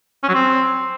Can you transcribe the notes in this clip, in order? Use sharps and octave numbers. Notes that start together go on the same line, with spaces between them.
C#4
F#3
C4